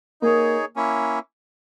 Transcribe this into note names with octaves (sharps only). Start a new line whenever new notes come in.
A#3 D#4 G#4 C#5
A#3 C#4 E4